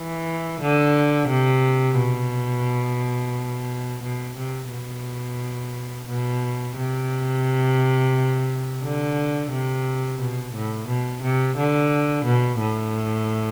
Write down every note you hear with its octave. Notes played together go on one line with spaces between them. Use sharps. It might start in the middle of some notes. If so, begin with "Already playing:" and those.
Already playing: E3
D3
C3
B2
B2
C3
B2
B2
C3
D3
C3
B2
A2
B2
C3
D3
B2
A2